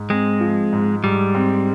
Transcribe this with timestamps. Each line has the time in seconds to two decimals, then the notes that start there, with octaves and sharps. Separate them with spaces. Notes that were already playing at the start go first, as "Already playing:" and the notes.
Already playing: G#2
0.10 G#3 C4
0.40 F3
0.72 G#2
1.03 G#2 G3
1.35 C4